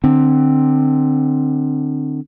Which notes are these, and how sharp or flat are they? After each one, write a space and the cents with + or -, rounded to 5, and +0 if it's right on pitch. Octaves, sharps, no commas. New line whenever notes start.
D3 +30 C4 +0